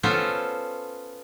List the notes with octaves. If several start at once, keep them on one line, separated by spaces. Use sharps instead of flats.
B3 C#4 F4 A4 C5